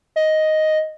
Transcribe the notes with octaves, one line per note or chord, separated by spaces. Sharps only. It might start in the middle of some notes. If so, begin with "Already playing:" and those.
D#5